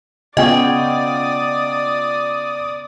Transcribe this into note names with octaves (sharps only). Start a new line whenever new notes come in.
C#3 B3 F4 D5 D#5 G5 C#6 D#6